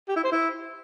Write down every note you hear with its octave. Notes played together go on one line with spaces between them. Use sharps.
G4
E4
C5
E4